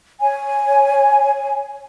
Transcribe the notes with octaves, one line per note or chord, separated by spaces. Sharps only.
C#5 G#5